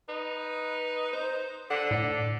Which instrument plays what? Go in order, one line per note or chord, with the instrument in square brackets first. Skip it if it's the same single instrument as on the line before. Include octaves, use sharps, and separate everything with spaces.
[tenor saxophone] D#4 [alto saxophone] B4
[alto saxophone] C5
[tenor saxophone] D3 [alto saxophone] F#5
[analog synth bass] A2 [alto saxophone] D4